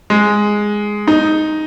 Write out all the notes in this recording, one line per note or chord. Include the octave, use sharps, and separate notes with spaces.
G#3
D#4